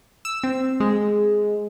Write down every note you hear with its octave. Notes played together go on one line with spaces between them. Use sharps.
E6
C4
G#3